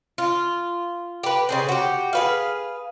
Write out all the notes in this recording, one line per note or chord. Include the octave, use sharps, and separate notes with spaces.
F4
G4 B4
C#3 G#4 C5
F#4 G4
G#4 B4 F5